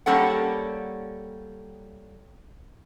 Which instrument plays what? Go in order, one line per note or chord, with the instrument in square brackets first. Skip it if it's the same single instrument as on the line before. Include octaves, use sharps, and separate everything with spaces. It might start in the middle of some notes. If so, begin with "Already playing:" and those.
[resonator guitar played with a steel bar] G3 A#3 C#4 G4 A4 F#5